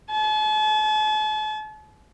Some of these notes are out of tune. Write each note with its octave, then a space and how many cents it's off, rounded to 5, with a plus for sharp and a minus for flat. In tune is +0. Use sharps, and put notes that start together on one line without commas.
A5 -45